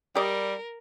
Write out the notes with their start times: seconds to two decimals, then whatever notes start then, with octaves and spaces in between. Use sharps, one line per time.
0.16 G3 G4 A#4 D5 D#5